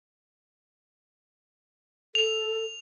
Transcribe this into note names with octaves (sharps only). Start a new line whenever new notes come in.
A4 F7